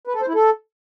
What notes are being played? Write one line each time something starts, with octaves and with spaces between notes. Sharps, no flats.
B4
A4
C5
E4
A4